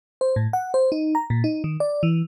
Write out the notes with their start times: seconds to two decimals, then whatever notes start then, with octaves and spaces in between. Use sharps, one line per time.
0.21 C5
0.36 A2
0.53 F#5
0.74 C5
0.92 D#4
1.15 A#5
1.30 A#2
1.44 D#4
1.64 D#3
1.80 D5
2.03 E3